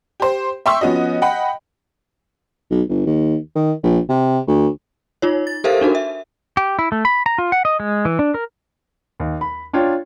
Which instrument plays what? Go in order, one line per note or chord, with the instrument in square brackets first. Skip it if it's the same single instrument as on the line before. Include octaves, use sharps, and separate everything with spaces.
[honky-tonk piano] G4 C5
E5 G5 C6 C#6 E6
F3 B3 C#4 F#4 D#5
D#5 F#5 G5 B5
[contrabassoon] B1
G1
D#2
D#3
A#1
C3
D2
[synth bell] D#4 F4 C#5
A6
G4 A4 A#4 C5 E5 F5
D4 D#4 F#4 A#4
E5
[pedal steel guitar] G4
E4
A3
B5
A#5
F4
F#5
D#5
G#3
E3
D4
A#4
[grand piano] D#2
B5
D4 F4 C#5 G5